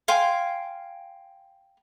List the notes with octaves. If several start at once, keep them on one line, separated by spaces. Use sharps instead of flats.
F5 G5 G#5 C6